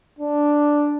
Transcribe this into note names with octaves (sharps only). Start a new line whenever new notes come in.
D4